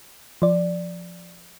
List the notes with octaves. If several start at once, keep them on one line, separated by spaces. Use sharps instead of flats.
F3 D5